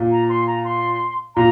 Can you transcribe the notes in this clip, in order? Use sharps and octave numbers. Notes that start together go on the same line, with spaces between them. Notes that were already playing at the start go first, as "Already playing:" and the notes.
Already playing: A#2
A#5
C6
A#5
C6
A#2 A#5